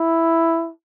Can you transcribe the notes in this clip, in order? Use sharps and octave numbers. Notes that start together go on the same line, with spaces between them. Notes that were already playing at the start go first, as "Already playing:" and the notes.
Already playing: E4